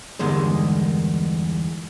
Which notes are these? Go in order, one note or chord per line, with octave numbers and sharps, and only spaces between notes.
E2 G2 D3 D#3 G#3